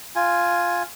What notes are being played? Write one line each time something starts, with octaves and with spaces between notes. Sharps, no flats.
F4 G#5